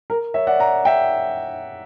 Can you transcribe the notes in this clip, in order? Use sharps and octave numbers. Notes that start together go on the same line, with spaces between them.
A#4
C#5 E5
D5 F#5
F#5 A#5
E5 G5